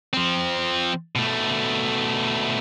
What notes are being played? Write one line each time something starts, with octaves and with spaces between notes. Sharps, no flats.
F3 C4
B2 A3